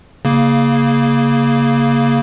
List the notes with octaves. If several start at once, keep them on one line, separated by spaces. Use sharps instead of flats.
C#3 A#3